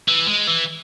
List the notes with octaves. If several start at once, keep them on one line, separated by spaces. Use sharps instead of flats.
E3
G#3
E3